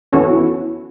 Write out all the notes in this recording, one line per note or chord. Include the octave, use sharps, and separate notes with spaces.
E3 B3 C#4 F#4 A4 C#5
E4